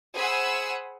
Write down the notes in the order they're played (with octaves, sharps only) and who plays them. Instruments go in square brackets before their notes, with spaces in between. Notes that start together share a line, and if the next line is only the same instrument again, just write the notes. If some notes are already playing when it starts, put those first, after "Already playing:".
[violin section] G#4 C5 F#5 G#5 B5 E6